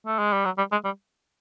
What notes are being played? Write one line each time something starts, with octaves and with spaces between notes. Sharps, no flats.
A3
G#3
G3
F#3
G3
G#3
G3